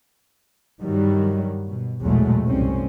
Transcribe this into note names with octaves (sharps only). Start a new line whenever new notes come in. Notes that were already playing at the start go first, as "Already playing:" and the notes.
G2 D#3 F#3 G3
B2
A#1 E2 B2 F#3 G#3 A3
C2 G2 C4 C#4